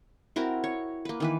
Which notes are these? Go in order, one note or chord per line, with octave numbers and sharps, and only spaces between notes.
C4 E4 F#4 A#4
C#5
A#3 B4
D#3 E3 B4